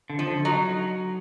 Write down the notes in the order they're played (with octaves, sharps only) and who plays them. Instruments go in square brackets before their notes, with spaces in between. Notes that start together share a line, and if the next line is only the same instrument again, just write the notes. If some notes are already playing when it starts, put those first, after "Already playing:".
[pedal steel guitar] D3
[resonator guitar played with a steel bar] F3
[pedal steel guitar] D3
[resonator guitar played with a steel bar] F#3 [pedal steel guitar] D#4